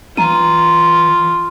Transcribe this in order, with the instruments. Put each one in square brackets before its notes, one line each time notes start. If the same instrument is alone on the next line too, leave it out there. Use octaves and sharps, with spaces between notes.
[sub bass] E3 [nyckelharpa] F4 [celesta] A#5 D#7